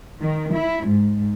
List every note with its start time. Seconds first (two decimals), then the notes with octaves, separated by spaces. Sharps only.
0.22 D#3
0.53 E4
0.88 G#2